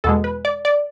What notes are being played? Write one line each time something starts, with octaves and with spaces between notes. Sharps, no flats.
E2 B2 G#3 A4
B4
D5
D5